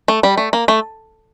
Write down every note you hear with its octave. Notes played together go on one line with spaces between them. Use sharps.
A3
G3
A3
A#3
A3